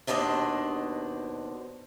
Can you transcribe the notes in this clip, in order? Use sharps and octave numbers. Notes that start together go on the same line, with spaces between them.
D#2 B2 D4 C5 D#5